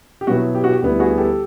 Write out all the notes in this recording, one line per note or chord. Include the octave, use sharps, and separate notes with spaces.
G4
B2 F#3 B3 E4 F#4
G4
F#4
G4
D2 D3 G3 B3 E4 G4
F#4 G#4
G#4
G4 A4